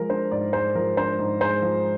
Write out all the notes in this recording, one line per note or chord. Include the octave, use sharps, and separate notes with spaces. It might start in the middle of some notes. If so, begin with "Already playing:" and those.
Already playing: F3 G#3 A#4
D4 C5
G#2 D5
G#3 C5
F3 A#4
D4 C5
G#2
G#3 C5
F3